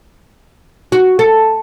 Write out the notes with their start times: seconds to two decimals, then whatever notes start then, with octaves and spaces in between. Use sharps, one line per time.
0.92 F#4
1.19 A4